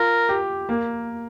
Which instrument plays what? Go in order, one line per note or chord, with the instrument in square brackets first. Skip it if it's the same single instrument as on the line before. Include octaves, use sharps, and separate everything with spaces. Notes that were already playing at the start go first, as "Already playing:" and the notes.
Already playing: [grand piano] F4 [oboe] A#4
[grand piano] G4
A#3